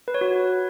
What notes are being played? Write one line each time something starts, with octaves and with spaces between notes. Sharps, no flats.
B4
C#5
F#4